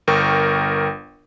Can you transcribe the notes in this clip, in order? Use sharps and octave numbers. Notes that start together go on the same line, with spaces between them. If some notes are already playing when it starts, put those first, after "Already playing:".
G1 A#4 G5 C#6